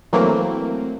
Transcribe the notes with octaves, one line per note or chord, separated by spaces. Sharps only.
E3 F#3 A3 A#3 C4